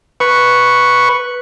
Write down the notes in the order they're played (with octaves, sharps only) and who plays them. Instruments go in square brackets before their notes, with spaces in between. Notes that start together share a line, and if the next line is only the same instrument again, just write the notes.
[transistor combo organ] B4 C#6